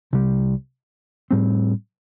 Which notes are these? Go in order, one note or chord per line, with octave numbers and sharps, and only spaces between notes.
C2 C3 G3
A2 G3 C4